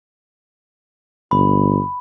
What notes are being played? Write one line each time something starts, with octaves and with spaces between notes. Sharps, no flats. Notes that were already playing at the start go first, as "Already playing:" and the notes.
G1 B5